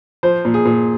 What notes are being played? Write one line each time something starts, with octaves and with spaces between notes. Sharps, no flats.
F3 C5
A#2
G#4
A#2